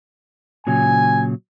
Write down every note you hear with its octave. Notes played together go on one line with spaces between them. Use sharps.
A#2 C#3 F#3 G#5